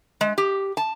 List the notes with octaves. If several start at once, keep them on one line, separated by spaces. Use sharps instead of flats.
G#3
G4
A5